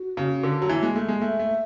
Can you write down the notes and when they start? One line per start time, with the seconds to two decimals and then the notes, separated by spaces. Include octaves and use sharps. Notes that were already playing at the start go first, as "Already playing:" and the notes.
Already playing: F#4
0.17 C#3
0.43 D3
0.62 F#3
0.69 E3
0.83 G#3
0.96 A3
1.09 G#3
1.22 A3 E5
1.39 A3